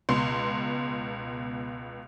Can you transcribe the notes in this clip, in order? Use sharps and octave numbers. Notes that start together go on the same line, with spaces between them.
C#2 B2 C6